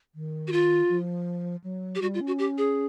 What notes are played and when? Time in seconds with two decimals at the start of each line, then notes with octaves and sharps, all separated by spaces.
0.15 D#3
0.47 F#4
0.52 F4
0.89 F3
1.64 F#3
1.95 G4
2.01 G3 F#4
2.14 F4
2.21 C#4
2.27 F#4
2.39 G4
2.58 G#4